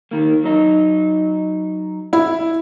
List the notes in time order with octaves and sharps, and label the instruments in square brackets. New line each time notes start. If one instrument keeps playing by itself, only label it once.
[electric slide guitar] D#3 A#3
F#3 D#4
[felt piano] E4